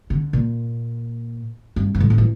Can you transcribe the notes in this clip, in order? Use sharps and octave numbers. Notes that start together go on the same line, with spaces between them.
D3
A#2
G2
G2
A2
F3
E3